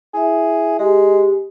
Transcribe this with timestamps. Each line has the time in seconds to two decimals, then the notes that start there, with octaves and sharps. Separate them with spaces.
0.14 E4 G#4 E5
0.79 G#3 G4